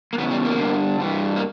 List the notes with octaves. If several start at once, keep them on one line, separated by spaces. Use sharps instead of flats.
A#3
E2 C#3 B3
G3
A#3
G2 D3
G2 E3
A#3